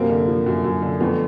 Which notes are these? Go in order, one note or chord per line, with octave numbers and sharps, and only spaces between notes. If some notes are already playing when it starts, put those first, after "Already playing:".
Already playing: F#2 C3 A#3 C4
D3
F3
F#2
F#2
D3
F2 A3 B3